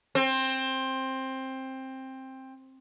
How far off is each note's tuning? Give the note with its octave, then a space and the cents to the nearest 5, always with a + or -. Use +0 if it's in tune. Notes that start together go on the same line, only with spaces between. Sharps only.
C4 +15